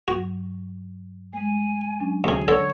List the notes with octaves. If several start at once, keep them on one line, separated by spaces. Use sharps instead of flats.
G2 F#3 F#4
G#3 A3 G#5
F#3 C#4 D4
D2 C3 G#4
D3 A4 C#5